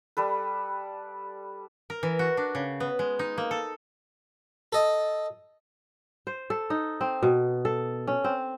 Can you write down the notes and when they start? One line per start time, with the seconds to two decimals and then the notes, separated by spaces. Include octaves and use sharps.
0.17 G3 A4 B4
1.90 A#4
2.03 E3
2.19 F#4
2.37 D4
2.55 C#3
2.80 B3
2.99 G#3
3.19 D#4
3.38 A#3
3.51 A4
4.73 A4 D#5
6.27 C5
6.50 A4
6.70 D#4
7.01 C4
7.23 B2
7.65 A4
8.07 C#4
8.24 C4